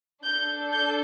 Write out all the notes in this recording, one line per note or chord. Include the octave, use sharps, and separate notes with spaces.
D4 A4 G6
G6